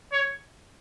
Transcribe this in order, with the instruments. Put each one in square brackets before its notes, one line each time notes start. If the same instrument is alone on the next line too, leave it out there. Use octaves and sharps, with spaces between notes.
[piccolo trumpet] C#5